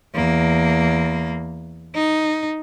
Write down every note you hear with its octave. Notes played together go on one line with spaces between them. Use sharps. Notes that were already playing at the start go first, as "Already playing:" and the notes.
E2 A#3
D#4